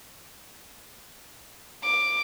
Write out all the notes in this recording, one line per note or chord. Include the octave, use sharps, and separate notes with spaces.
D6